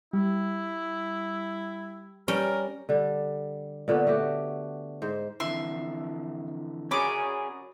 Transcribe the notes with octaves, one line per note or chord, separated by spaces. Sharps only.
G3 E4
G3 C#4 A#4 G5
D3 G3
A#2 D3 B3 C#5
A3 F#4 G4
G#2 C5
F2 D3 E3 E5 C6
C#4 F#4 G#4 A#4 C#5 D5 B5 D6